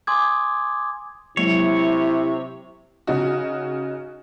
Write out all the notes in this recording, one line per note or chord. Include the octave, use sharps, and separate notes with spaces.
G#5 C6 D6 D#6 G#6
C3 F#3 G#3 A#3 E4 C#5
C#3 D#4 F#4